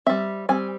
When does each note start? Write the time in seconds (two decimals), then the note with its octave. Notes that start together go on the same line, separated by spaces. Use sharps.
0.06 G3 C4 E5
0.49 G3 C4 G#5